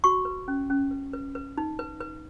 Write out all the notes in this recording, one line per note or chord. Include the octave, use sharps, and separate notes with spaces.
F#4 C#6
B4
C#4
C#4
B4
B4
B4
D#4
B4
B4